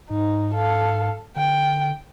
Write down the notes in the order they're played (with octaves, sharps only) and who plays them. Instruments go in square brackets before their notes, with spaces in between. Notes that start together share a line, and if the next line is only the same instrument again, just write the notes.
[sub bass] G#2 [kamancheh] D#4
[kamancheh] A4 F5
[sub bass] D3 [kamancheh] G5